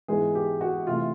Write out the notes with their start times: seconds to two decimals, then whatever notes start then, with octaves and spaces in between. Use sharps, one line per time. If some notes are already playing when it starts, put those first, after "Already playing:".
0.08 G#2 E3 G#3 B3 G#4
0.35 G4
0.61 F#4
0.87 C3 E3 A3 F4